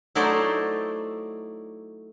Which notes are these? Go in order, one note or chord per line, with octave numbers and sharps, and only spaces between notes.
F#3 A3 D#4 E4 C5 D5